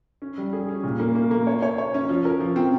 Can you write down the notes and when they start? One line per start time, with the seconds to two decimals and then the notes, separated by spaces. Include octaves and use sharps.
0.22 C#4
0.38 G3
0.53 G#4
0.69 C#4
0.84 A#2
1.00 A#3
1.15 A#3
1.31 A#3
1.47 C#5
1.62 C#5
1.78 C#5
1.94 C#4
2.09 F3
2.25 A#4
2.40 F3
2.56 C4